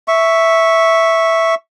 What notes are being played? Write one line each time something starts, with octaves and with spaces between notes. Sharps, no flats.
E5 C#6